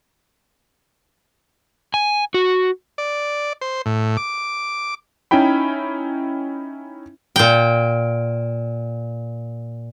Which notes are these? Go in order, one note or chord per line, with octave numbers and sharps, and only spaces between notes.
G#5
F#4
D5
C5
A2
D6
C#4 D#4 E4 G5 B5
A#2 G5